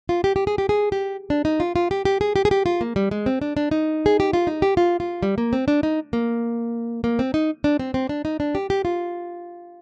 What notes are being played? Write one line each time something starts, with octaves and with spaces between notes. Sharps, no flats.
F4
G4
G4
G#4
G4
G#4
G4
D4
D#4
F4
F4
G4
G4
G#4
G4
G#4
G4
F4
A#3
G3
G#3
C4
D4
D4
D#4
G#4
G4
F4
D#4
G4
F4
F4
G3
A#3
C4
D4
D#4
A#3
A#3
C4
D#4
D4
C4
C4
D4
D#4
D4
G4
G4
F4